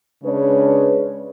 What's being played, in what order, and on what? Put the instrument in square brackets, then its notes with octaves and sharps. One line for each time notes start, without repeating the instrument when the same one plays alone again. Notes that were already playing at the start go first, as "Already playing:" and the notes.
[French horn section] C#3 G#3 D4 B4 C#5